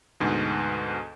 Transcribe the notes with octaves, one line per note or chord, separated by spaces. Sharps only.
D2 G#2 B2